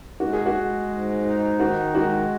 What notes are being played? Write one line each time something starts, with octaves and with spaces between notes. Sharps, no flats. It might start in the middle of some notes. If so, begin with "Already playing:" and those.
G#3 F#4
G#4
F#4
G#3
G#2
D#4
D#3 F#4
G#3 F#4